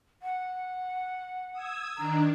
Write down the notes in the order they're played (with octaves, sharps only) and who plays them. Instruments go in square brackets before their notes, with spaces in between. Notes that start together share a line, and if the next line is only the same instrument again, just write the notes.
[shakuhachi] F#5
[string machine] D#6 E6 G#6
[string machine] D#3 D4 [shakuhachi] A#5